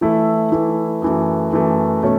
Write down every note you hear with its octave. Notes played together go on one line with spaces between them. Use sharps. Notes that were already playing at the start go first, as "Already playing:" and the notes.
E3 A3 E4
E3 A3 E4
F#2 E3 A3
F#2 E3 A3
B2 A3 C#4